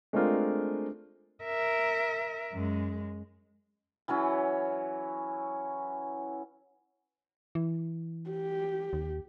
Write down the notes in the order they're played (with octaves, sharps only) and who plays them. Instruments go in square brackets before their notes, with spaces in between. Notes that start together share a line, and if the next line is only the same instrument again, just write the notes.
[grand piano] G#3 A3 C4 D4 F4 A#4
[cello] A#4 E5
F#2 G#3
[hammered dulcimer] E3 F#3 C#4 E4
[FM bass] E3
[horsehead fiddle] G4
[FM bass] D#2